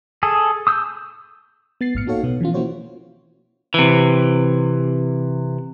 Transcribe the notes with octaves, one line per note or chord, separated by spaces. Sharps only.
G#4 A4
D#6 E6 G6
B3 A6 C7
A#1 G#2 F6 C#7
A#3 D#4 F#4 A4 C#5 F5
B2 B3
E3 F3 C#4 F4
A#3 C#4 E4 F#4 C5 C#5
C3 E3